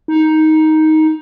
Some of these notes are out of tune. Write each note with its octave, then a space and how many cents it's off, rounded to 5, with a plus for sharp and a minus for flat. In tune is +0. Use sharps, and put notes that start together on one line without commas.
D#4 +10